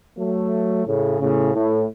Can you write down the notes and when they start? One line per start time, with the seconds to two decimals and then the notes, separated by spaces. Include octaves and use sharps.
0.16 F#3 A3
0.85 A2 C#3
1.19 A2 C#3
1.54 A2